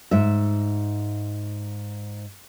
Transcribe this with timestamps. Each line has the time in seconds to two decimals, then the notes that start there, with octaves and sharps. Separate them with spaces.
0.11 G#2 E5